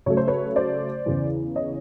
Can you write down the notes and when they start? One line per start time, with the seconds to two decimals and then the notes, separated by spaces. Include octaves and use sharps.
0.06 C#3 F#3 A3 C#5
0.17 C5
0.28 B4 C#5
0.56 C5 D5
1.06 E2 C#3 E3
1.56 C#5 D#5